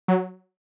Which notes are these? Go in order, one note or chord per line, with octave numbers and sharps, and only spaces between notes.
F#3